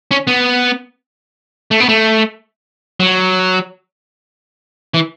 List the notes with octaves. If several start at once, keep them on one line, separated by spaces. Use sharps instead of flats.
C#4
B3
A3
B3
A3
F#3
E3